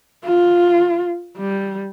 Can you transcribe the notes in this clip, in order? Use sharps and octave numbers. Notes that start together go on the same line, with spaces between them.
F4
G3